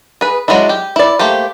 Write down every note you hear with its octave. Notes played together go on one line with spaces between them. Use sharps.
G#4 B4
F#3 G#3 C#4 D4 E4
G4
E4 D5
A3 A#3 G4 C5